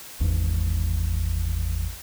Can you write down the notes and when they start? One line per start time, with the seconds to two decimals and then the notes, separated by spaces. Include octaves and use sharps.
0.20 G#1 E2 G#2